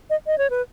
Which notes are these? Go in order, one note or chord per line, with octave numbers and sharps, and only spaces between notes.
D#5
D#5
C#5
B4